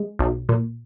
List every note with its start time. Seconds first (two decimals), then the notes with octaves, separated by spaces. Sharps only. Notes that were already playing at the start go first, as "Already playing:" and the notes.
Already playing: G#3
0.19 B1
0.49 A#2